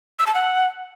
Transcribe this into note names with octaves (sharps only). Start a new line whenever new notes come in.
E6
A5
F#5